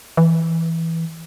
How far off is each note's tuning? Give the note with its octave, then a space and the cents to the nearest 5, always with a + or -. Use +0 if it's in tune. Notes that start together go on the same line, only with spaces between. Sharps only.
E3 -5